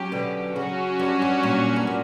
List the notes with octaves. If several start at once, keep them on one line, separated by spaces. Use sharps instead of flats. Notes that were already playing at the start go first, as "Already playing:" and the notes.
Already playing: F#3 C#4 G4
B2 D3
C#3 F#3 C#4 F#4
G2
G2
A#2
G2
A#2